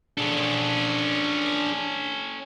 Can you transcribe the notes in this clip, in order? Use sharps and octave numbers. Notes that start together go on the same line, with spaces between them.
C#4 D4 G#4 A4